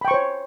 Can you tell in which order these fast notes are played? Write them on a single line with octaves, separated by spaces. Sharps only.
B5 G5 C#6 C5 C#5